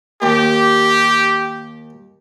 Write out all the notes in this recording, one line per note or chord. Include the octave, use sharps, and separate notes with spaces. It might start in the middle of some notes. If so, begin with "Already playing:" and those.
D#2 G4